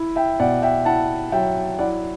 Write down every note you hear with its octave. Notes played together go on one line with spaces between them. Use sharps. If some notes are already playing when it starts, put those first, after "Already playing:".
Already playing: E4
E5 G5
B2 D5 F#5
E5 G5
E4 F#5 A5
F#3 E5 G5
E4 D5 F#5